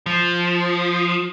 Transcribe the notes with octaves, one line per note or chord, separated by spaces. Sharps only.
F3